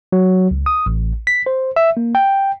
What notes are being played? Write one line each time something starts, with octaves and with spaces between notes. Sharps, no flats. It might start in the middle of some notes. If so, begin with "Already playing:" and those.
F#3
C#2
D#6
A1
B6
C5
E5
A#3
G5